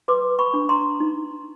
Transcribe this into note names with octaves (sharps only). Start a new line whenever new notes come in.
B4 C6 D6
B5 C#6
D4
A#5 C6
D#4